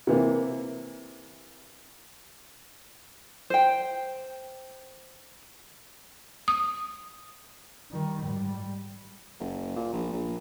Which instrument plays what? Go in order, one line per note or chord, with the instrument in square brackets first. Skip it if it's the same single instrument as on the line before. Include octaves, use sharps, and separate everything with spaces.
[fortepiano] C3 E3 A#3
[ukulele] C5 G5
[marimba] D#6
[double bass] D#3 G3
G#2 G3
[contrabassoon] F#1
A#2
A#1
A#1